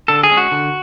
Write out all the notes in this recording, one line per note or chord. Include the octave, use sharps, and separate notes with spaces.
D3 A4
G#4
G#3 C#4
F#4
D3